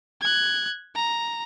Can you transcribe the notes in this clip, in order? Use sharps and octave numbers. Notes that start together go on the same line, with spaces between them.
F#6 G#6
A#5